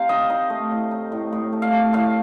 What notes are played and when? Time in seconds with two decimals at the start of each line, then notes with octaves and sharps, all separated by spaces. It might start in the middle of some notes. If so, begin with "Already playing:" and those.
Already playing: C3 F5
0.09 D#4 D#5
0.30 D#4
0.50 A3
0.71 A2
0.91 D#4
1.12 A2
1.32 A2
1.52 A3
1.62 F5
1.73 A3
1.93 A2 F5